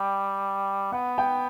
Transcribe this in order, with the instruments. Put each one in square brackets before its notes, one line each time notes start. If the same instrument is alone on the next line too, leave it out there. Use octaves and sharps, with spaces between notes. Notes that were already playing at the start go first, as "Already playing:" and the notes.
Already playing: [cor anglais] G3 [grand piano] G5
[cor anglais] B3 [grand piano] F#5
[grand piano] G5